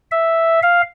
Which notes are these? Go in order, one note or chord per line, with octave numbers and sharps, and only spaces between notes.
E5
F5